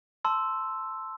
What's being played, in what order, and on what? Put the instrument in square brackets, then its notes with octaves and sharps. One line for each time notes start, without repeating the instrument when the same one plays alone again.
[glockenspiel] A5 C6 E6